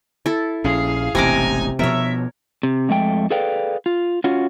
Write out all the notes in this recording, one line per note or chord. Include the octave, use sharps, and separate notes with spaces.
E4 A4
A#1 C#4 G#4 F5
E1 A1 C3 D#4 G#5 A#5 D6
B2 F3 B3 A#4 C#5 E5
C3
F2 G#3 A3 G5
G#4 A4 B4 D5 F5 G5
F4
C#4 F4 F#4